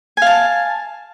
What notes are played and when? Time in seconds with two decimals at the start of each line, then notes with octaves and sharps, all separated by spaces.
0.17 G#5
0.22 F5
0.26 A5